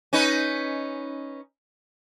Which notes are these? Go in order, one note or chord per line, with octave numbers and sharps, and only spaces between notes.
C#4 D#4 B4